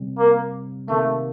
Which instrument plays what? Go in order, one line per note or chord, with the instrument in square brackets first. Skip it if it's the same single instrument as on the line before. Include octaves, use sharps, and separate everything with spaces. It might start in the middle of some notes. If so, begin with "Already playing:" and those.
Already playing: [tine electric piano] C3 G3 C4
[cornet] A#3
[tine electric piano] C3 D#3 A#3 [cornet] A3